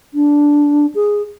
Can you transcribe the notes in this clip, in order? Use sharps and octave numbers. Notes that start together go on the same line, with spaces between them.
D4
G#4